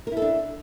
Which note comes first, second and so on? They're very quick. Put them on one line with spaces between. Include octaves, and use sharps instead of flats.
A#4 E4 A4 D4